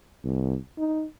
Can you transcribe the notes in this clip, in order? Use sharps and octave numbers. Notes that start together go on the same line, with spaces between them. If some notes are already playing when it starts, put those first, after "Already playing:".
C2
D#4